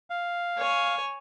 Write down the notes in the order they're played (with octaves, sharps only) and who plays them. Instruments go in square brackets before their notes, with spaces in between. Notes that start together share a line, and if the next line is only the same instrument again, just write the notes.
[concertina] F5
[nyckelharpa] C#5 G#5